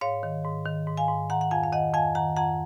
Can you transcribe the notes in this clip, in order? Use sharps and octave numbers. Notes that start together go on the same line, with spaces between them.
G#2 C#5 F5
D#3
G#2
D#3
G#2
F5 G#5
G#2
D#3 F#5 A#5
F#5
F2 F5 G#5
F5
D#3 D#5 F#5
F2 F5 G#5
D#3 F#5 A#5
F2 F#5 A#5